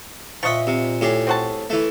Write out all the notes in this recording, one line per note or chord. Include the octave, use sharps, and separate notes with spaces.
A#2 F3 D#5 E5 F#5 C#6
C3
A2 G4 G#4
C4 F#4 A5
E3 A3